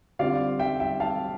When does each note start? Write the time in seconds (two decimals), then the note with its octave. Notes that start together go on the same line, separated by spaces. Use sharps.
0.19 D3 G3 C4 F4 D5 F5
0.59 E5 G5
0.80 E5 G5
1.00 F5 A5